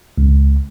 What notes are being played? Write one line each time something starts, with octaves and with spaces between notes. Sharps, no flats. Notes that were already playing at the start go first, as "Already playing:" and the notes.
C#2